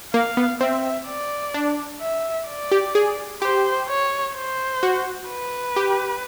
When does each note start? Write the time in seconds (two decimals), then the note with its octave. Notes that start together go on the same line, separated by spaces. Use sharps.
0.14 A#3 F5
0.37 B3
0.60 C4 E5
1.07 D5
1.54 D4
2.01 E5
2.49 D5
2.71 G4
2.95 G#4
3.42 G4 C5
3.89 C#5
4.35 C5
4.83 F#4
5.29 B4
5.76 G4